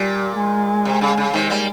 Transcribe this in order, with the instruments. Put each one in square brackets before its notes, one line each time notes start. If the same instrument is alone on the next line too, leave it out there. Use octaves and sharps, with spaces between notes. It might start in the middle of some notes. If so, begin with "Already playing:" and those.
Already playing: [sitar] A#2 [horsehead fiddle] G3
[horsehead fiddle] G#3
[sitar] C3
C#3
C#3
[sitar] C3 D#3 [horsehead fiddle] G#3
[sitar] G3 A#3